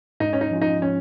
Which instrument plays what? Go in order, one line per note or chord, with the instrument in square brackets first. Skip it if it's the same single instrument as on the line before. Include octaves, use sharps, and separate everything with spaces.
[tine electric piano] G#2 [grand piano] D#4
[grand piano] C#4
D#4
[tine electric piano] F3 C#4 F4
[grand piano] D#4
C#4